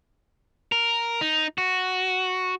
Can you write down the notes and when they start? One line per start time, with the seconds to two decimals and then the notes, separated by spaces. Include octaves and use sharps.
0.72 A#4
1.21 D#4
1.58 F#4